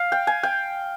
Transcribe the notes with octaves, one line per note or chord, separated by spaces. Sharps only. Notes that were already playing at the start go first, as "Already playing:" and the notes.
Already playing: F5
G5
G#5
G5